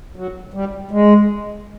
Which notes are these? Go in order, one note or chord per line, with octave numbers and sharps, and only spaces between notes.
F#3
G3
G#3